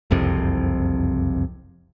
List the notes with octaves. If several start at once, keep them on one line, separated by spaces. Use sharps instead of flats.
F#1 C2 F2 C3